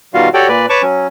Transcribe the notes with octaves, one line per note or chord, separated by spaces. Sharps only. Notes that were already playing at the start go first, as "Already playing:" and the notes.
B2 D#3 G3 F4 F#4 F5
F#4 G4 A4 C#5 D5 G5
A#2 B4 D5
B4 C#5 A5 C#6 D6
F#3 C#4